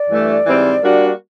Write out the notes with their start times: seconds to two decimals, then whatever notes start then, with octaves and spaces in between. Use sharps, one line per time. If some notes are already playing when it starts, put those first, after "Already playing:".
Already playing: D5
0.09 G2 E3 A3 D4
0.45 G#2 E3 G3 C4
0.81 G3 A#3 D4 F#4